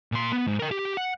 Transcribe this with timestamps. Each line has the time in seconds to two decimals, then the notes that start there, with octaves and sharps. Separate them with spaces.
0.12 A#2 C6
0.33 B3
0.47 G#2
0.59 A#4 G5
0.71 G4
0.97 F#5